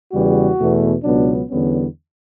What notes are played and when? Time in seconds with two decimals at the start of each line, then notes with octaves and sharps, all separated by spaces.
0.12 E2 C#3 G3 B3 F#4
0.58 E2 B2 A3
1.04 C#2 B2 F#3 B3 D4
1.50 E2 D3 G3 B3 C#4